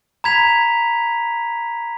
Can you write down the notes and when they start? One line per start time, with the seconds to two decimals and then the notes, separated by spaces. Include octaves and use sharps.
0.24 A#5 B5 G#6 B6 F7